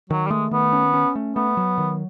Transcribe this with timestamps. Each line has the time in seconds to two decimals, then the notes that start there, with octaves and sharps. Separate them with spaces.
0.10 D#3 F#3
0.27 G3
0.30 G#3 A3
0.51 D#3 B3
0.73 C#4
0.94 C#4
1.15 A3
1.36 A3 B3
1.57 F#3
1.78 D#3